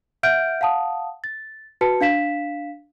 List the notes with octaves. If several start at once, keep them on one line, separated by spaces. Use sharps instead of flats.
E5 F#5 F6 G6 D7
F5 F#5 A5 D#6
A6
F#4 B4 A5 C#7
D4 F5 B6 E7